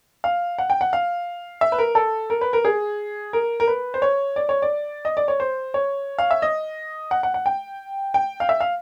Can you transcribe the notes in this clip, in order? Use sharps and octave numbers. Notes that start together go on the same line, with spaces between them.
F5
F#5
G5
F#5
F5
E5
B4
A#4
A4
A#4
B4
A#4
G#4
A#4
A#4
B4
C5
C#5
D5
C#5
D5
D#5
D5
C#5
C5
C#5
F5
E5
D#5
F#5
F#5
F#5
G5
G5
F5
E5
F5